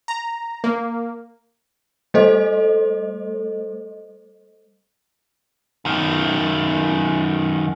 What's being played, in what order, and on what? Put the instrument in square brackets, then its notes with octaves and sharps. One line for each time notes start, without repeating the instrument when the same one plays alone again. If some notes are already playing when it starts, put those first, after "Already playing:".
[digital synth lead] A#5
A#3
[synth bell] G3 A3 A4 C5 D#5
[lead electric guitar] F#2 D#3